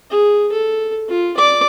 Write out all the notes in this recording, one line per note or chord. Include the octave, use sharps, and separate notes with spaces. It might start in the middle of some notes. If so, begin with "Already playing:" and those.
G#4
A4
F4
D5 D6